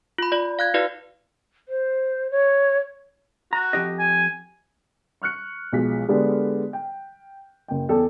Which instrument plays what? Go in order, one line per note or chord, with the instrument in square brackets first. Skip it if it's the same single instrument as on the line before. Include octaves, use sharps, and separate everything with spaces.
[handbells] F4 B5
F4 D5
F5 F#6 G#6
E4 F#4 B4 D5 F5
[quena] C5
C#5
[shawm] F#4 [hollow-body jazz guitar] A#5
[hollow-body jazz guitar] F2 G4 D#5
[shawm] G#5
[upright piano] C#6 F6 F#6 C#7
B1 F3 G#3 B6
D3 G#3 B3 G4 A4 D5
G5
F#1 G5
E2 A4 G5